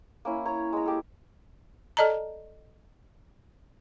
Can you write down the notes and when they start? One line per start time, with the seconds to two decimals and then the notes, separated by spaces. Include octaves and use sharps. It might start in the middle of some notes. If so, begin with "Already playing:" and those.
0.25 A#3 C#4 E4
0.45 C#5 A#5
0.73 G#3 A#5
0.86 G4 A4
1.97 A4 D5 D#5 A5 A#5